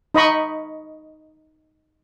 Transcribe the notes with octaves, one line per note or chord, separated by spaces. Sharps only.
D#4 D#5 B5 C#6